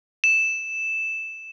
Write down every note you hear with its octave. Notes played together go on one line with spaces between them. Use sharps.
E7